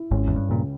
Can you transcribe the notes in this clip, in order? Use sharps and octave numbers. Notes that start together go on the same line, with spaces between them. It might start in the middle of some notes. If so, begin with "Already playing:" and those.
Already playing: E4
G#1 G#2 C#4
E2
G2
C#2 A#2